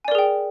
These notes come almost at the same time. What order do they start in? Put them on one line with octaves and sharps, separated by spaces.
G#5 D5 A#4 G#4 G5